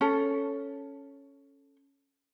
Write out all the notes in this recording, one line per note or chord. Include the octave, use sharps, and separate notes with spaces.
C#4 A4